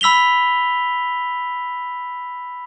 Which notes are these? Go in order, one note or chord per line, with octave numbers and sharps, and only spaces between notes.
B5 E6 B6 F7 G7